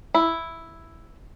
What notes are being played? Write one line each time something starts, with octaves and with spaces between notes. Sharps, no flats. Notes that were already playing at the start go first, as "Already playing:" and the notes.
E4